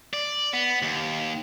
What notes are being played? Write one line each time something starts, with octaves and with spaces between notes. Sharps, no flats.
D5
B3
D#2